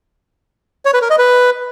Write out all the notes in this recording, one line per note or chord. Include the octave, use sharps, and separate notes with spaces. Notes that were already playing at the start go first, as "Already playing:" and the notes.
C#5
B4
A#4
D#5
B4